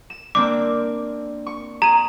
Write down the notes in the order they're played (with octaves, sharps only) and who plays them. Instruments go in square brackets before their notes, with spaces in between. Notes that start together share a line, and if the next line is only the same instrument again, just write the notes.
[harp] E7
[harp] A#3 C4 D4 [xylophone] D6
[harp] C#6
[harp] G#4 [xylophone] A#5 D#7